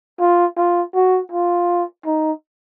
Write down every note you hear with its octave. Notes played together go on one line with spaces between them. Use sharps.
F4
F4
F#4
F4
D#4